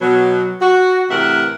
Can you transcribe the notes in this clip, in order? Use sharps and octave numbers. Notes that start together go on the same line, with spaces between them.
B2 F#3
F#4
A2 C3 E3 A#4 E5 F#5